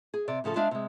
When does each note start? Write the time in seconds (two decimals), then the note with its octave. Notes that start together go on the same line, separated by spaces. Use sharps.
0.14 G#4
0.28 C3 D5
0.44 A2 C#3 F3 A4
0.56 G#3 D4 C5 D5 E5 F5
0.71 C3 G#3